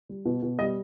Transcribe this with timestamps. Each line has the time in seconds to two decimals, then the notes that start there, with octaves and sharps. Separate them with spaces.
0.09 G3
0.25 B2
0.42 B2
0.59 G3 D#5